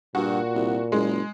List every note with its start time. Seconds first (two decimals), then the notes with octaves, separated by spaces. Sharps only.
0.15 G2 A#2 F#4
0.55 C2
0.92 F#1 G#3